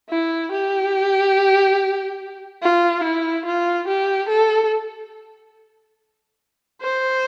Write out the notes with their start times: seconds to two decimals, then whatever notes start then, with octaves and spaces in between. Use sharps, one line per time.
0.10 E4
0.52 G4
2.62 F4
3.04 E4
3.46 F4
3.88 G4
4.29 A4
6.81 C5